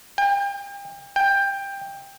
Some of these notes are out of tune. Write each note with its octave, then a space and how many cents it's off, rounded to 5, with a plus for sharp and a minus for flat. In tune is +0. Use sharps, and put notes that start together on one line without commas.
G5 +35
G5 +15